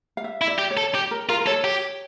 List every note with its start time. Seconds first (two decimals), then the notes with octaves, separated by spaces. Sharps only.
0.17 F5
0.24 E5
0.41 E4
0.47 D5
0.59 G4
0.71 C#5
0.77 A4
0.95 G4
1.11 A#4
1.29 F4 A#4
1.41 A#4
1.46 A4 C#5
1.64 G4